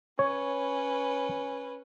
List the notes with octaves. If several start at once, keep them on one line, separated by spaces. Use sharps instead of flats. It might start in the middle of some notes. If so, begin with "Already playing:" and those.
C#4 B4 C#5